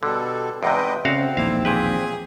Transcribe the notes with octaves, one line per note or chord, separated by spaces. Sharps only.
B2 D3 G3 A4
E2 G#2 C3 B4 D#5 G5
D2 C#3 C4 F#4 F5
E1 A#1 D#2 C3 A3 E4 F5
A#2 G4 G#4 B4